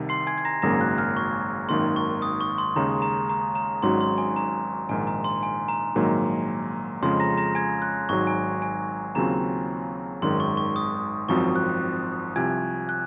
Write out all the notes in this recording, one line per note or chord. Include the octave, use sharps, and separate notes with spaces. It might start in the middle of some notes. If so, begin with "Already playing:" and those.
Already playing: C2 C3 D#3
C6 C7
G#5 G#6
G#6
A#5 A#6
G#1 F#2 C#3 F#3 A#3 A#5 A#6
F#6
F6
C#6
G#1 F#2 D#3 A#3 C6
C#6
D#6
C#6
C6
D#2 C#3 G#3 D#4 A#5
A#5
A#5
A#5
G#1 G#2 F#3 C#4 F#4 C6
C6
G#5
A#5
A#1 G#2 D#3 G#5
A#5
C6
G#5
A#5
A#1 G#2 D#3 F#3 A#3
F2 C#3 F3 G#3 C#4 C6
A#5 A#6
A#5 A#6
G#5 G#6
F#6
G#1 G#2 F#3 C#6
G#5
G#5
D#2 C#3 F#3 C4 F4 A#5
G#1 F#2 D#3 G#3 C6
C#6
C#6
D#6
G#1 F#2 F3 C4 F#4 C#6
F#6
C2 C3 F3 G#5 G#6
F#6